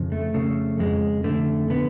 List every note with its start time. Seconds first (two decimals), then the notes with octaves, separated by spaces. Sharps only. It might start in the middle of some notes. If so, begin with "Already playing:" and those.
Already playing: F2 C#3
0.12 A3
0.34 C#3 A3
0.79 F2 G#3
1.24 D3 A3
1.70 D3 B3